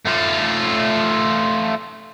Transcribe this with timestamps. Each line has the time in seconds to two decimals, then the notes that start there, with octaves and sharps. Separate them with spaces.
0.05 A3 F4